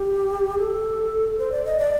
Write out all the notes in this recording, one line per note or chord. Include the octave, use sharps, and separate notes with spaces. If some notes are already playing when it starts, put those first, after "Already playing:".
Already playing: G4
A4
C5
D5
D#5
D5